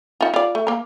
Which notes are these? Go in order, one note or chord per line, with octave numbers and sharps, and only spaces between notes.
D#4 F4
F4 D5
A3
A#3 A#4